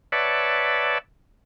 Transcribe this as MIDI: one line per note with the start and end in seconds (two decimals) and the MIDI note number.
0.12 0.98 71
0.12 0.98 73
0.12 0.98 74
0.12 0.98 76
0.12 0.98 78
0.12 0.98 81